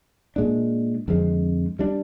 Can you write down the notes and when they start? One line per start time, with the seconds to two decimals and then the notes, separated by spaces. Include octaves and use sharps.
0.36 A#2 G#3 D4
1.08 F2 D3 G#3 C4
1.79 G3 D4